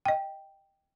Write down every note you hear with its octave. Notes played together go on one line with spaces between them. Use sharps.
D#5 G5